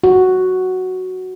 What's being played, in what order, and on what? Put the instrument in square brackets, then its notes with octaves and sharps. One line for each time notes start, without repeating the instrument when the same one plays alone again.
[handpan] F#4